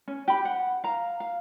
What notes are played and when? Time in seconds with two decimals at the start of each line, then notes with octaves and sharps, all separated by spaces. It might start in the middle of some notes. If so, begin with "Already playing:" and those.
0.08 C#4
0.28 G4 B5
0.45 F#5
0.84 F5 A#5
1.20 F5